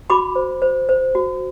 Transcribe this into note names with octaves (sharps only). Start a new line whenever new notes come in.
F#4 B5 D6
C5
C5
C5
F#4